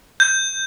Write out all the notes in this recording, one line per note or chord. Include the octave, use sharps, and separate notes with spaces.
G6